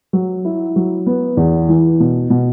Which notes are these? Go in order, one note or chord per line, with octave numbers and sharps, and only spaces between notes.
F#3
E4
F#3
B3
E2
E3
B2
B2